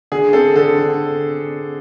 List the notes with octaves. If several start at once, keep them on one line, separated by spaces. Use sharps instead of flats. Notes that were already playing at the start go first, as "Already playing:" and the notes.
D3 G#4
C4 A4
D3 A4
D3